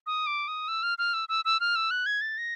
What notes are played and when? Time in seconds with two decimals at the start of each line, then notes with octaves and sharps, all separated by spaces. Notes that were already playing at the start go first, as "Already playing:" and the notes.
0.07 D#6
0.27 D6
0.48 D#6
0.68 E6
0.83 F6
0.98 F6
1.14 E6
1.29 E6
1.45 E6
1.60 F6
1.76 E6
1.91 F#6
2.06 G#6
2.21 A6
2.38 A#6